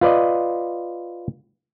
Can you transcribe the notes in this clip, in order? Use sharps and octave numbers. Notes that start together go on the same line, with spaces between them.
F4 B4 D5 D#5